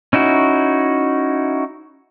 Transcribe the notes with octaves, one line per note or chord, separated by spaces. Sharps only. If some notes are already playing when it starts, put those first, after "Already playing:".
C#4 D#4 E4 F#4